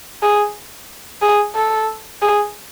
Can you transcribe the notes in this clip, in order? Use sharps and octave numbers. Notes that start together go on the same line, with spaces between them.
G#4
G#4
A4
G#4